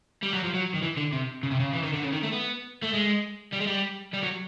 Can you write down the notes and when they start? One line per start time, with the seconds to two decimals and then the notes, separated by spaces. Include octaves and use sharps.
0.23 G3
0.33 F#3
0.44 F3
0.54 F#3
0.75 D#3
0.83 E3
0.97 D3
1.13 C3
1.43 C#3
1.51 C3
1.60 C#3
1.73 E3
1.83 D#3
1.93 D3
2.03 C#3
2.12 D#3
2.23 A3
2.33 B3
2.83 A3
2.93 G#3
3.52 G3
3.60 G#3
3.67 G3
4.14 G3
4.23 F#3